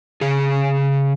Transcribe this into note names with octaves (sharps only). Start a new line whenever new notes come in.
C#3 G#4